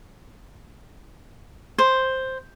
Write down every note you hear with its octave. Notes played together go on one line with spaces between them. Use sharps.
C5